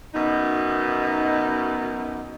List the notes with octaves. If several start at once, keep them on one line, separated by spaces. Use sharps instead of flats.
F#2 B2 D#4